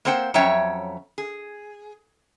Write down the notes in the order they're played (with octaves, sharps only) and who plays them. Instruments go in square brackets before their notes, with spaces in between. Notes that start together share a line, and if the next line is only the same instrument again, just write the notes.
[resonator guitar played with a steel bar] A#3 C4 C5 F#5 G5
F2 F#3 C#4 C#5 E5 G5
G#4